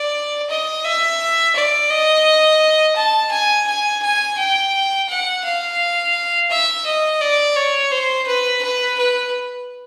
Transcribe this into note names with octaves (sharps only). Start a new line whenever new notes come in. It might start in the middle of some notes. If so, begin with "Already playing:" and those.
Already playing: D5
D#5
E5
D5
D#5
A5
G#5
G#5
G#5
G5
F#5
F5
E5
D#5
D5
C#5
C5
B4
B4
B4